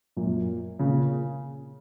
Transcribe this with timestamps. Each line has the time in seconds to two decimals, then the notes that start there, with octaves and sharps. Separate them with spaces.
0.17 F#2 A#2
0.79 A#2 C#3